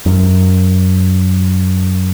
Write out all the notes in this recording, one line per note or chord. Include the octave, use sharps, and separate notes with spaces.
F#2